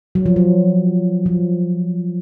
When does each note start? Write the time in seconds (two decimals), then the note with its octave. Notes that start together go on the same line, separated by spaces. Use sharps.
0.15 F#3
0.26 F3
0.36 F#3
1.26 F3